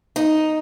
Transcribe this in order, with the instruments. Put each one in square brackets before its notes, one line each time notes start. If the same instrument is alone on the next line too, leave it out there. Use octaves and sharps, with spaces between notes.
[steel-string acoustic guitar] D#4